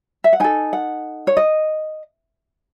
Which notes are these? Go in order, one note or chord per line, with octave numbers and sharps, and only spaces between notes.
E5
F#5
D#4 A4 G#5
F#5
C#5
D#5